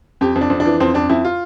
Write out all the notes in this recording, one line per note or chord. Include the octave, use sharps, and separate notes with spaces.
F2 G4
F2
D4
F2
D4
E3
F2 C4
F2 D4
F2 E4
F4